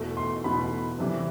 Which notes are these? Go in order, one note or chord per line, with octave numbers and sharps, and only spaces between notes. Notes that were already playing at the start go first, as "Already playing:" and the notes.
Already playing: E2 B2 A3
C6
E2 B2 A3 B5
C3 E3 G3